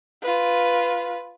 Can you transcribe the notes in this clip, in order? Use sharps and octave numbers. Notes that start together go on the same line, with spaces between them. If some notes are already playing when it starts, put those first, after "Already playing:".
F4 B4